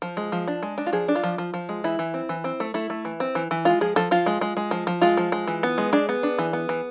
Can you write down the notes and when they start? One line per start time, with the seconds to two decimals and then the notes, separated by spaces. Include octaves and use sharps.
0.02 F3
0.17 G#3
0.32 F3
0.48 D4
0.63 G#3
0.78 D4
0.86 F4
0.93 F3 G#4
1.08 D4
1.15 F4
1.24 F3
1.38 F3
1.54 F3
1.69 G#3
1.84 E3 E4
1.99 E3
2.14 C4
2.29 E3
2.44 C4
2.60 A3
2.74 A3 E4
2.90 A3
3.05 E3
3.20 C4
3.35 E3
3.51 E3
3.65 G#3 F4
3.81 F3 G#4
3.96 F3 A4
4.11 F3 F4
4.26 G#3
4.41 G#3
4.57 G#3
4.71 F3
4.87 F3
5.02 G#3 F4
5.17 F3
5.32 G#3
5.47 E3
5.63 B3
5.78 G#3
5.93 D4 G#4
6.09 B3
6.23 D4
6.39 E3
6.53 B3
6.69 E3